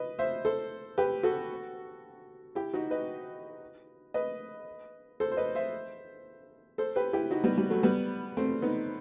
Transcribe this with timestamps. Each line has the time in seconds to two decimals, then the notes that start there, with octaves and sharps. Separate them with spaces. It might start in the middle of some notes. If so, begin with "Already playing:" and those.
Already playing: B4 D#5
0.19 C5 E5
0.45 A4 C5
0.98 G4 B4
1.23 F#4 A4
2.55 E4 G4
2.74 D#4 F#4
2.91 B4 D#5
4.14 B4 D#5
5.20 A4 C5
5.31 C5
5.37 B4 D#5
5.55 C5 E5
6.78 A4 C5
6.96 G4 B4
7.13 E4 G4
7.31 D#4 F#4
7.44 G3 B3
7.58 G3
7.70 F#3 A3
7.83 G3 B3
8.37 A3 C4
8.62 B3 D#4